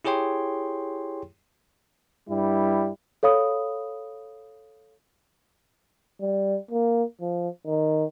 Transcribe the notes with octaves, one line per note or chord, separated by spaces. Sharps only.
E4 G4 G#4 C#5 G5 C6
G2 G3 E4
A4 C#5 F5 B5 D#6
G3
A#3
F3
D#3